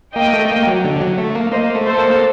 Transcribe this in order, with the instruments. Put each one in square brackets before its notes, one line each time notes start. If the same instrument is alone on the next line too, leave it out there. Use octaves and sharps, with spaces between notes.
[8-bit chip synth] A#3 [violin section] D#5 G5
[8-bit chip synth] A3
A#3
F#3
D3
F#3
A3
A#3
[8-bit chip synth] A#3 [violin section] C5 D#5
[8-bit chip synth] A3
[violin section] A4 C5
[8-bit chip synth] A#3